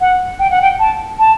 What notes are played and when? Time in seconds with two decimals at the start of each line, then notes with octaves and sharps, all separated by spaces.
0.01 F#5
0.39 G5
0.50 F#5
0.62 G5
0.79 A5
1.19 A5